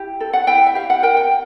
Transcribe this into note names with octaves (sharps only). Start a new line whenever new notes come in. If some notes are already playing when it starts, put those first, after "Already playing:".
Already playing: E4 G4
A4
F#5
E4 G5
E5
G4 F5
F#5
A#4 G5
G5